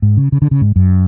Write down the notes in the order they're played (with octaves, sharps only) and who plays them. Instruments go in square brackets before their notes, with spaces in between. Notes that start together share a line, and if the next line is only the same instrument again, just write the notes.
[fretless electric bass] G#2
C#3
C#3
D3
C#3
G#2
F#2